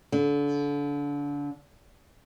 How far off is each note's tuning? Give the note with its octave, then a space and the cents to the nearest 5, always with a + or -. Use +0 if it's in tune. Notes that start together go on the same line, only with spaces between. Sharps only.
D3 -30